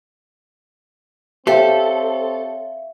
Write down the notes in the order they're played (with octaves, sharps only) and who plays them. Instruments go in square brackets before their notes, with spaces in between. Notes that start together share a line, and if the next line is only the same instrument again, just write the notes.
[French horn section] C4 C#5 [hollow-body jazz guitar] G4 C5 [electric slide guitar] A4 [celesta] E5 F5